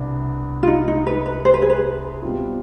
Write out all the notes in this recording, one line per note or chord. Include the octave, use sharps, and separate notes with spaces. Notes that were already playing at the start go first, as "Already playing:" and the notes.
Already playing: C2 B2 B3 D4
F4
D#4
D#4
B4
B4
C5
B4
G#4
B4
B2 G3 C4 F4